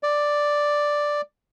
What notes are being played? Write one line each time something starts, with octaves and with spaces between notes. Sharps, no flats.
D5